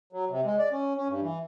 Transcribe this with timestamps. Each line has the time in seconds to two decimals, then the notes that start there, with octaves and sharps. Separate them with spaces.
0.13 F#3
0.30 C3
0.45 G#3
0.59 D5
0.72 C#4
0.97 C#4
1.08 G2
1.22 E3